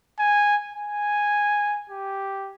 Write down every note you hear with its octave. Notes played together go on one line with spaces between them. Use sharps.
G#5
G#5
G4